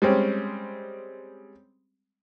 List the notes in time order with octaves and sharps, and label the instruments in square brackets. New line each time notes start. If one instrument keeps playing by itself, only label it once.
[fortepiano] G3 G#3 C4 C#4